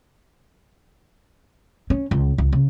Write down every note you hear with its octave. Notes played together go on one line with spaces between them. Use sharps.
C#4
C#2
C#2
C#3